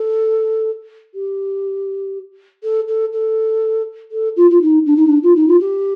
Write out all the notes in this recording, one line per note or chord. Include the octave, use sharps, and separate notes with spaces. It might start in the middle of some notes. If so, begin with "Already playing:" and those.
Already playing: A4
G4
A4
A4
A4
A4
F4
F4
D#4
D4
D#4
D4
F4
D#4
F4
G4